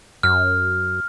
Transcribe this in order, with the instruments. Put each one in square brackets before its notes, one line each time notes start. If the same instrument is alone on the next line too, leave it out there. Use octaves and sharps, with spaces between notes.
[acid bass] F#2 [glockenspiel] F6